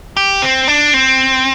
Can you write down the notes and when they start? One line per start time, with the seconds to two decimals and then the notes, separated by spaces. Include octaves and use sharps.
0.17 G4
0.42 C4
0.68 D4
0.94 C4